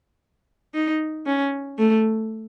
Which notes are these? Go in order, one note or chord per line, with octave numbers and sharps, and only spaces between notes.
D#4
C#4
A3